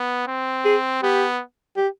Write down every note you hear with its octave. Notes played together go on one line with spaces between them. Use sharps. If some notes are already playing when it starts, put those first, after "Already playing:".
Already playing: B3
C4
G#4
B3 G4
G4